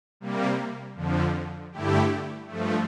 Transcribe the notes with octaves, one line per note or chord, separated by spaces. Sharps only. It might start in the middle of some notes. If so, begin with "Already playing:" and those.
C3 G3 A#3
F2 D3 F3
G2 D3 A3 E4 G4
G2 F3 A3